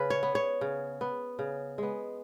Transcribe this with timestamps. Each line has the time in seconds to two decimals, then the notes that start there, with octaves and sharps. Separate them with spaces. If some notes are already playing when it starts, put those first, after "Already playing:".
Already playing: C#3 B4
0.10 C#5
0.23 B3
0.35 C#5
0.61 C#3
1.01 B3
1.39 C#3
1.78 G#3 B3